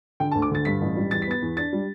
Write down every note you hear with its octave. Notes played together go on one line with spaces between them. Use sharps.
D3 G5
A5
D2
D6
D3 A6
G2 B6
A1
G3
E2 A6
B6
B3 A6
E2
D4 A6
G3